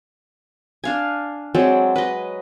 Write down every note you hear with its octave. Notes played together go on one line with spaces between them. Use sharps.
D4 F5 G#5
F#3 G#3 C4 D5
B4 D#5